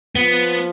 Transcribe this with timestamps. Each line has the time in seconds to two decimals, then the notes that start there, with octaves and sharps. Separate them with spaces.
0.15 F3 B3